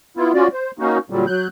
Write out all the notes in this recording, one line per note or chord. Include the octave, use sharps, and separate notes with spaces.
B3 E4 F4
C#4 F4 F#4 D5
C5
A#3 C#4 D#4 F#4
A#2 D3 F#3 G3
F#3 F#6 G6